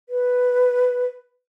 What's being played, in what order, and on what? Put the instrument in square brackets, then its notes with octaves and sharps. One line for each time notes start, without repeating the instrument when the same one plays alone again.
[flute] B4